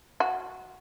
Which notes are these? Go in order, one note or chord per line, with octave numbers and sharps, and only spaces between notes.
F#4